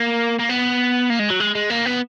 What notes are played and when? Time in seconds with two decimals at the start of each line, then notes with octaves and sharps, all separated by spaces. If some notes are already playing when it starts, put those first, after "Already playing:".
Already playing: A#3
0.39 A#3
0.49 B3
1.10 A#3
1.19 G#3
1.30 F#3
1.40 G#3
1.55 G#3
1.70 A#3
1.86 B3